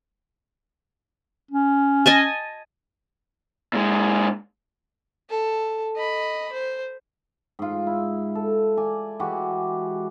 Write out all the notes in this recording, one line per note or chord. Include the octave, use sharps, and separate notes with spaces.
C#4
D#5 G#5 A5
A#2 G#3
A4
D#5 B5
C5
G#2 F4
E4
A4
D5 G#5
E3 G#3 F#4 G4